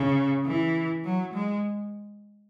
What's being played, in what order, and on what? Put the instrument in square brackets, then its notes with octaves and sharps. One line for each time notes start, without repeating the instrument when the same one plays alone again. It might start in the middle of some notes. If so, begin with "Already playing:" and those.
Already playing: [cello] C#3
E3
F#3
G#3